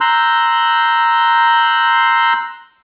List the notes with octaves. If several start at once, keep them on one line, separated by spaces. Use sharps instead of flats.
A#5 C6 E6 F#6 G6